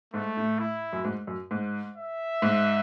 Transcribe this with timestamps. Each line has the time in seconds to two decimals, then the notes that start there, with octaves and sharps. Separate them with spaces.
0.13 G#2 A3
0.37 A2
0.59 E4
0.93 F#2
1.04 G#2
1.27 F#2
1.51 G#2
1.96 E5
2.42 G#2